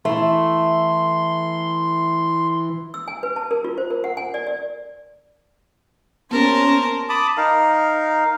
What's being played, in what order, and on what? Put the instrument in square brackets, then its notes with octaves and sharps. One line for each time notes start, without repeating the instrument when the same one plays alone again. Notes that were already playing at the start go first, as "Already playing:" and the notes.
[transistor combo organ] E3 [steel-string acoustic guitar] A3 E4 [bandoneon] C6
[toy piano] E6
G#5
B4
A5
A#4
F4
C5
A#4
F#5
G#5
D5
D5
[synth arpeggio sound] A#3 B3 G4 [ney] C#4 [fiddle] A#4 [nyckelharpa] C5 A5
[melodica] A5 B5 D6 D#6
D#4 A#4 F5